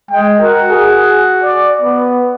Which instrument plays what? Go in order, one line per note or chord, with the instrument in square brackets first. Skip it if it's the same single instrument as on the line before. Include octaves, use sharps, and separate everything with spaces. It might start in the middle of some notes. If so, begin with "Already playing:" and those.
[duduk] G#3 [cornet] G5
[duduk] F#4 [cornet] A#4
[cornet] G#4
D5
B3